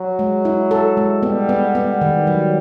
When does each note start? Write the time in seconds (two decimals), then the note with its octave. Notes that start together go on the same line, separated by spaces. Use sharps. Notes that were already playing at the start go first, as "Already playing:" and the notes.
Already playing: F#3
0.19 G#3
0.45 E4
0.71 A4
0.97 G#3
1.23 G3 B3
1.49 B3
1.75 B3
2.01 D#3
2.27 F#3